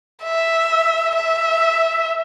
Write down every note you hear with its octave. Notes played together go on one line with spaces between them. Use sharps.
E5
E5